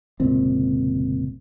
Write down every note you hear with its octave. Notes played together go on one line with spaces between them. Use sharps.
F1 C#2 A#2 C4